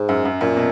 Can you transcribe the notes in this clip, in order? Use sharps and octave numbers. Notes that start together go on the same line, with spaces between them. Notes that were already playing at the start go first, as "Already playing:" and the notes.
Already playing: G#2
F#2
F#2
F#2 A#2
B2